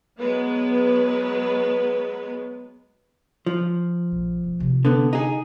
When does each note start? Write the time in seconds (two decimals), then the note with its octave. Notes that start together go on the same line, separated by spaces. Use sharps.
0.19 F#3 G#3 B3 B4
3.46 F3
4.12 A#1
4.44 E1
4.59 C3 D4
4.85 D3 B3
5.13 D#4 G#4